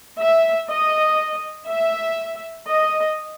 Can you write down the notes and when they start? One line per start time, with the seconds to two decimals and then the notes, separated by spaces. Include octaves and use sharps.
0.18 E5
0.69 D#5
1.69 E5
2.68 D#5